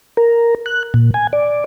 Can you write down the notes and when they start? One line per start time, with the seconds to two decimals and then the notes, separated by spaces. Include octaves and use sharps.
0.17 A#4
0.66 F#6
0.94 A#2
1.14 G#5
1.33 D5